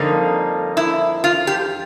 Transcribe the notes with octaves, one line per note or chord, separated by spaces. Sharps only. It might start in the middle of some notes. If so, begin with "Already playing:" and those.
Already playing: F2 D3 G3 A#3 D#4
E4
F4
G4